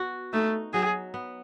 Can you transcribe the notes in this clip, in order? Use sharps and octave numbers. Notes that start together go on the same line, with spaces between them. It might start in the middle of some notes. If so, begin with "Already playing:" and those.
Already playing: B3 F#4
A3 D#4
F#3 G#4
B3